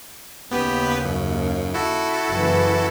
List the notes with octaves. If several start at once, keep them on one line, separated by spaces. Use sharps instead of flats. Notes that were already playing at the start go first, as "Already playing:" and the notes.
D#2 C#3 B3 G4 B4
F#2
E4 F#4 A4
F#1 E3